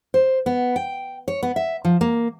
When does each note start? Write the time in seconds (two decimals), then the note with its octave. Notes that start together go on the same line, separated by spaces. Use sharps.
0.14 C5
0.46 B3
0.76 G5
1.28 C#5
1.43 B3
1.56 E5
1.85 F3
2.01 A#3